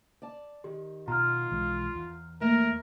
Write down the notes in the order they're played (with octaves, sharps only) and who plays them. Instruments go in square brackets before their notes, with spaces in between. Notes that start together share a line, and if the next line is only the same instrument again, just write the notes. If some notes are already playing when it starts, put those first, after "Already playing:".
[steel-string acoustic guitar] D5 A5
[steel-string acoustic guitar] D#3 [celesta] G4
[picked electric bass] B2 [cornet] F4 [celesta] A#5 F6
[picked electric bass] B1 E3 G#3
E2
[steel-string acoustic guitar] A3 A#3 [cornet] A#4